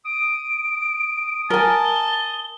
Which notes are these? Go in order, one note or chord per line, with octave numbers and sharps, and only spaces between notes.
D#6 D7
A#4 G#5 A5 G7